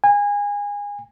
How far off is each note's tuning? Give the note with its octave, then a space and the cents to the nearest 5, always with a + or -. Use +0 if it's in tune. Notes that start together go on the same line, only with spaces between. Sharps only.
G#5 -25